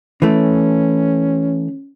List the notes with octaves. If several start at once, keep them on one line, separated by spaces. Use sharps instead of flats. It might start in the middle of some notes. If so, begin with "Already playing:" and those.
E3 A3 C#4